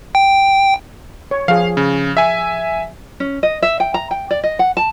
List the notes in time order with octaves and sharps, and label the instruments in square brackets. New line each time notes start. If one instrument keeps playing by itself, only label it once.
[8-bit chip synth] G5
[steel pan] C#5
[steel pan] F3 G#4 [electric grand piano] F5
[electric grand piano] C#3
E5 G#5
[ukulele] C#4
D#5
E5
G5
A#5
G5
D5
D#5
F#5
A5